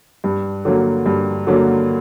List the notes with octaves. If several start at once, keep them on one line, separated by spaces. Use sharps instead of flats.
G2
D3 F#3 A#3
G2
D3 F#3 A#3